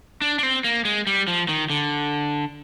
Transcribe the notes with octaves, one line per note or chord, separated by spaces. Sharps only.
D4
D4
C4
A#3
G#3
G3
F3
D#3
D3